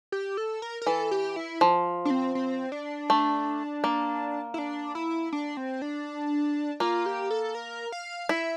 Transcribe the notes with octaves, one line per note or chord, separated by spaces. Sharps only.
G4
A4
A#4
A#4
E3 A4
G4
E4
F3
D4
C4
C4
D4
A3
A#3
E4
D4
E4
D4
C4
D4
A#3 F4
G4
A4
A#4
F5
E4 E5